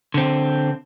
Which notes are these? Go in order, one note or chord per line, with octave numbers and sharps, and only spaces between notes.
D3 C4